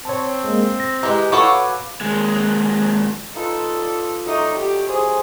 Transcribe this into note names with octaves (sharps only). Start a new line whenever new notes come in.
C4 C#5 A5
G#3 A#3
A#6
E3 G#3 G4 D#5 A#5
F#4 A4 B4 C#5 F5 D6
D#2 G#3
D#4 F4 A4 B4
D5
F#3 A3 D#4 D6
G4
G#4 C5